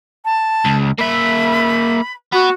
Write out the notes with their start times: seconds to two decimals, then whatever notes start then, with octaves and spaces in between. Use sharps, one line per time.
0.25 A5
0.65 C#2
0.99 A#3 E5 B5
2.33 B3 F#4